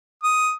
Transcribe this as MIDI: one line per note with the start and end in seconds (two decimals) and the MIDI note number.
0.23 0.52 87